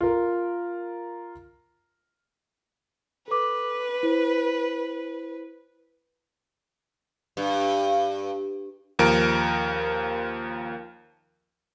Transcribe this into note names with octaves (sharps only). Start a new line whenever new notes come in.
F4 A#4
A4 B4 D6
E4 C5
G2
D#2 F3 A#4 D7